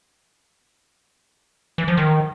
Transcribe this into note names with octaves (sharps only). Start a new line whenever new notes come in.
E3
F3
D#3